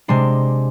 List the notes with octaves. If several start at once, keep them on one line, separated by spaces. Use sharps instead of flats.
C3 G#3 D4 C6